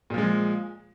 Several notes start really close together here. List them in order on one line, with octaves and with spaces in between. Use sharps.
A#2 F3 G#3